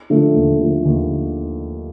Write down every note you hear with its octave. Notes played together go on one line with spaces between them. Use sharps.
D3 F3 A3
D#2
D3 F3 A3
D#2